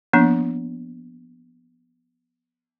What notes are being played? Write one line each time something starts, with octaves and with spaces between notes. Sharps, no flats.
F3 A#3 B3 D4